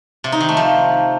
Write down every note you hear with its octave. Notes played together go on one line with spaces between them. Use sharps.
C3
D#4
D#3
A3
F3